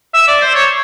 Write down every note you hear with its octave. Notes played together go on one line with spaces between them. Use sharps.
E5
D5
C5
C#5